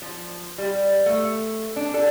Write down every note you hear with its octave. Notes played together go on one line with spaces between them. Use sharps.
F3
G3
A3
D4
A4